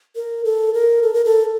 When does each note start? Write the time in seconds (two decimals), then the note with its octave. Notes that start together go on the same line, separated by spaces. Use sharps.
0.16 A#4
0.45 A4
0.74 A#4
1.03 A4
1.14 A#4
1.25 A4